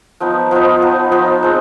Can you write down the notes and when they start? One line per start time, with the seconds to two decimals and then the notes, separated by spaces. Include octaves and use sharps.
0.20 F3 B3 D#4
0.51 F3 B3 D#4
0.82 F3 B3 D#4
1.11 F3 B3 D#4
1.43 G#3 C4